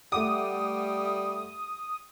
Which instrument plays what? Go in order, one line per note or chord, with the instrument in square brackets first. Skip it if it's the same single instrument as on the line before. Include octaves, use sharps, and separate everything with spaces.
[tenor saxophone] G3 [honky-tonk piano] A3 F#5 D6 [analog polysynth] D#6